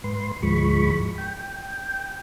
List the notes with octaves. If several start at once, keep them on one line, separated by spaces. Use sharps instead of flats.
G#2 B4 C6
D2 G#2 F3 G#3 B5 C#6
G5